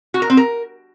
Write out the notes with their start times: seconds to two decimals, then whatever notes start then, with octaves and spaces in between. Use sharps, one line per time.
0.14 F#4
0.22 A#4
0.30 C4
0.37 A#4